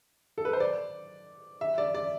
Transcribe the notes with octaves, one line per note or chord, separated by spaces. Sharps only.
A4
B4
C5
D5
E5
D5
D5